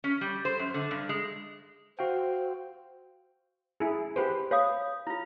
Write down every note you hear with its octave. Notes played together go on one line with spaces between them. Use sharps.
C#4
G3
C5
F#2
D3
G2
G#3
F#4 C5 F5 G5
E4 G#4
G4 B4 C5
B4 C#5 F5 D#6
E4 F4 A#5